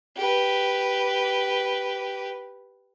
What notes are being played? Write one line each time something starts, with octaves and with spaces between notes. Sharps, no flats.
G4 B4